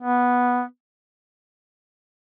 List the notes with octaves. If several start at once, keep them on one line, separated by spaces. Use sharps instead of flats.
B3